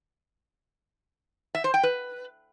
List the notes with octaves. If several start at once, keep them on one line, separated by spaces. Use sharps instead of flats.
E5
C5
G5
B4